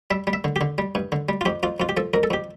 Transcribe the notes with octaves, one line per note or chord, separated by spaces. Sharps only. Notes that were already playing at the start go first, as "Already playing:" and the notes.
G3 E5
G3
E5
D3
D3 G4
G3
G2
D3
G3
F4
F2 G4
F2 F4
F2 F4
G4
F3 A4
F2 A#4
A4
F2 G4